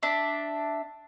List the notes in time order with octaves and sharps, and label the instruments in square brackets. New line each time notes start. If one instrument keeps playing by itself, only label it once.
[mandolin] D4 E5